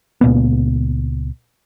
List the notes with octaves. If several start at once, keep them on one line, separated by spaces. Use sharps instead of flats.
C#2 A#2 A#3 B3